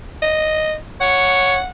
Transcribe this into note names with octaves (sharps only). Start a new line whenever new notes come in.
D#5
C#5 F#5